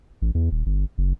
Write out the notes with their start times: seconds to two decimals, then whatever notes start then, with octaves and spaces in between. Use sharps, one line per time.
0.22 A1
0.35 E2
0.51 D#1
0.66 G1
0.98 F#1